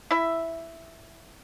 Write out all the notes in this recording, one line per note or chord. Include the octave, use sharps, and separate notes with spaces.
E4 E5